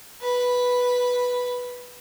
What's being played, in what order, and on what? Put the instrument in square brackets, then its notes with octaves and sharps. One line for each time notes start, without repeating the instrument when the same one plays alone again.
[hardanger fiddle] B4 B5